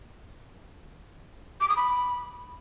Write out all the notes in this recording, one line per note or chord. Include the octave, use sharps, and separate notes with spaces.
D6
D#6
B5